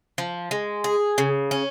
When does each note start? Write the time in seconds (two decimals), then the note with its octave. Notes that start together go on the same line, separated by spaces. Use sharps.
0.18 F3
0.51 G#3
0.84 G#4
1.18 C#3
1.51 C#4